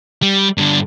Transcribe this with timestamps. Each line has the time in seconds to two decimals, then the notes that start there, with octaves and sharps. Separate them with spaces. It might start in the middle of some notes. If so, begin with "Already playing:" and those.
0.22 G3
0.58 G2 D3